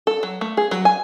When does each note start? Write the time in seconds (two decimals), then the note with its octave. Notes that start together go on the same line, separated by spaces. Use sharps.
0.07 A4
0.23 F#3
0.41 A3
0.57 G#4
0.71 F#3
0.85 G#5